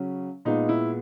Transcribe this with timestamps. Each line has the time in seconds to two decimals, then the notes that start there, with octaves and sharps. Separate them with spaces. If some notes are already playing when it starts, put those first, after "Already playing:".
Already playing: C#3 F#3 C#4
0.45 A#2 G#3 B3 D#4
0.69 E4